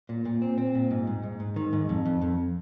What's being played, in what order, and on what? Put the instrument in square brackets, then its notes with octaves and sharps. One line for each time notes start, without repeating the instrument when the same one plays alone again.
[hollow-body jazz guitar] A#2
A#2
C4
C4
A#2
G#2
G#2
G#2
G#2
D#3
G#2
F2
F2
F2